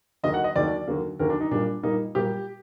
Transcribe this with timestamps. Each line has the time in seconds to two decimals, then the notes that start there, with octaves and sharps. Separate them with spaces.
0.23 D#2 D3 F#3 A#3 D#5
0.34 F#5
0.44 D#5
0.55 D#2 D3 F#3 A#3 D5
0.87 D#2 D3 F#3 A#3
1.19 D#2 D3 F#3 A#3 A#4
1.30 D4
1.40 D#4
1.51 A#2 G3 A#3 D4
1.83 A#2 G3 A#3 D#4
2.15 A#2 G3 A#3 G4